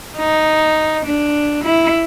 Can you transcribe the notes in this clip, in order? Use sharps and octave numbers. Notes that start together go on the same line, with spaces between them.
D#4
D4
E4